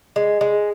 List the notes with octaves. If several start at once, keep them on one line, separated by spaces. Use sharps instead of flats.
G#3
G#3